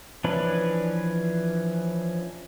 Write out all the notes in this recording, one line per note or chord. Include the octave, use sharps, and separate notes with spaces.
E3 F3 C#4 D4 B4